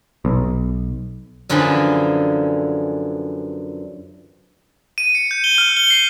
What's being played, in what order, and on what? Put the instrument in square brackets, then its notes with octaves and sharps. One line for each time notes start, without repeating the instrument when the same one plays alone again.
[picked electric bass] B1
[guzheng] F#2 D3 E3 F3 G#4 B5
[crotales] D#7
C#7
G6
G7
F6
G7
C7